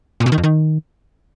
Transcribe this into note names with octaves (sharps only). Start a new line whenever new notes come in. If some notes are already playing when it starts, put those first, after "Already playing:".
A#2
B2
D#3
F2
D#3